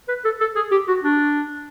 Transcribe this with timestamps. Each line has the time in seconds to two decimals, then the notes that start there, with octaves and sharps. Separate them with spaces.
0.08 B4
0.25 A4
0.41 A4
0.56 G#4
0.72 G4
0.88 F#4
1.04 D4